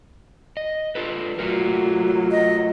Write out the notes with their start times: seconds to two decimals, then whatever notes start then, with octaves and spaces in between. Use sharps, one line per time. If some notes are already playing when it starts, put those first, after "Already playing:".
0.57 D#5
0.95 F4 A4 B4
1.39 F#3 A3 F4 A#4
2.30 D#5